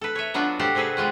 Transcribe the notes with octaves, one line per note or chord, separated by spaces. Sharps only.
A4 B4
C#5 E5
F#3 B3 D4 F4 F#4
F#4 G4 A4 C5 F5 F#5
C3 C4 G#4 A4 B4
G3 G#3 F4 F#4